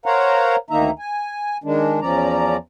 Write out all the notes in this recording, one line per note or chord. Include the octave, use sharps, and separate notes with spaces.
A#4 C5 C#5 F5 F#5 A#5
D2 D#3 A#3 D#4 E5 A#5
G#5
D#3 G#3 D4
E2 F3 C#4 D5 A#5